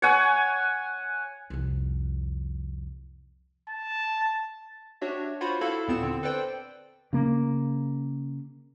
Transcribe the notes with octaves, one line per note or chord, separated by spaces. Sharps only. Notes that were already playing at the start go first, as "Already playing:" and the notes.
C#5 F#5 G#5
C2 F2
A5
D4 F#4 G4 C#5 E5
F4 F#4 C5 C#5 F#5 B5
E4 F#4 A4 F5 A5 B5
D#2 A#2 B3 C4 C#7 E7
D3 C4
A4 B4 C5 D5 G5
C#3 A#3